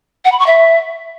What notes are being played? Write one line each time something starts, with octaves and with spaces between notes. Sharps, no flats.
F#5
B5
C#6
E5